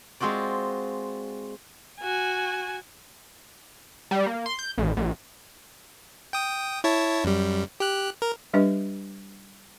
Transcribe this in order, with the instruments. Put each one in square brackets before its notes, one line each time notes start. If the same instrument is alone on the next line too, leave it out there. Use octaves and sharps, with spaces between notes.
[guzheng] G#3 C4 F4 F#4 D5
[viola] F#4 G#5
[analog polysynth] G3
A#3
C6
G6
A1
A#1
[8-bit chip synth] G5 D#6
E4 C#5 A5
F#2 G3
G4 F#6
A#4
[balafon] G3 D4 G4 B4 D#5